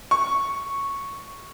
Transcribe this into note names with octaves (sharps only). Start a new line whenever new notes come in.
C#6